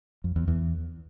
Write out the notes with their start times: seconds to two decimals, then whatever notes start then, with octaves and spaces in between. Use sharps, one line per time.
0.24 F2
0.36 E2
0.48 E2